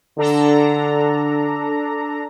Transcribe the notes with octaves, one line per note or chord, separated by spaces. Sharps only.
D3 D4 A4 A#5